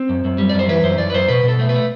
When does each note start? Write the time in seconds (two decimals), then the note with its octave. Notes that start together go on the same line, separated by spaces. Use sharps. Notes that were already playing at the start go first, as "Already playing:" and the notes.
Already playing: C4
0.09 F#2
0.24 F#2
0.38 G3
0.49 D5
0.54 F#2
0.59 C5
0.68 E3 B4
0.83 F#2 C5
0.98 F#2 D5
1.10 B4
1.14 F#2 C5
1.28 B2 B4
1.43 B2
1.48 A4
1.59 A3
1.69 B4
1.74 A3